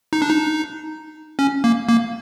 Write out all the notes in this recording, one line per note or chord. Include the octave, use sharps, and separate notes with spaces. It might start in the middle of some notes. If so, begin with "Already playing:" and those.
D#4
D4
D#4
C#4
A#3
A#3